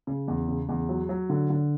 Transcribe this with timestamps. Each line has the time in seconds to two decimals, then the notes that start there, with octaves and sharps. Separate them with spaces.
0.07 C#3
0.28 E2
0.48 C#3
0.69 E2
0.89 F#3
1.09 F#3
1.29 D3
1.50 D3